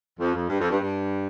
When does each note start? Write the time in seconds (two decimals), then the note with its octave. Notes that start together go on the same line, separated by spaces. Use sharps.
0.20 F2
0.35 F2
0.49 G2
0.60 F2
0.70 G2
0.80 G2